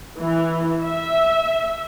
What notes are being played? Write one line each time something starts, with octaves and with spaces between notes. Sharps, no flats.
E3
E5